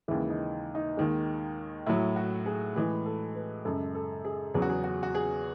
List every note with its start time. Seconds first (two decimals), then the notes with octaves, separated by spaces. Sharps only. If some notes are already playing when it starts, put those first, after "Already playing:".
0.08 D#2 C#3 E3 G#3 E4
0.30 D#4
0.75 D#4
0.97 D#2 D#3 G#3
1.86 A2 F#3 E4
2.16 F#4
2.46 G#4
2.75 A2 E3 G#3 G#4
3.06 A4
3.35 B4
3.65 F#2 C#3 G#3 A4
3.95 A4
4.25 G#4
4.54 E2 C#3 F#3 G#4
4.62 F#4
4.70 G#4
4.84 F#4
5.03 F#4
5.15 G#4